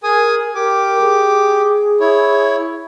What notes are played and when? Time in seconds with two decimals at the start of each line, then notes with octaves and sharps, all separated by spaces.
0.03 G#4 A#4 G#5 D#6
0.55 G4 A#4 D6
1.01 G#4
2.00 E4 C#5